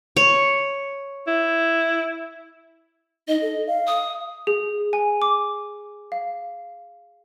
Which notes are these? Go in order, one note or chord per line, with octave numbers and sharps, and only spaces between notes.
C#5
E4
D#4 D#5
A4
F5
D#6
G#4
G#5
D6
F5